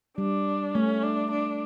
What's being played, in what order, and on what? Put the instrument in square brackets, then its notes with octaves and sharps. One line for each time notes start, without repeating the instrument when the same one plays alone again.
[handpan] G3 [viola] D4
[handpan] A3 [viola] C#4
[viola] D4
D4